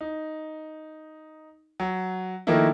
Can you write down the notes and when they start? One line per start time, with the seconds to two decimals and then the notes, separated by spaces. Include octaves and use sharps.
0.01 D#4
1.80 F#3
2.47 D#3 F3 A3 A#3 D#4 E4